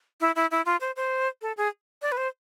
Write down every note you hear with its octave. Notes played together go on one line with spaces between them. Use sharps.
E4
E4
E4
F4
C5
C5
A4
G#4
D5
B4
C5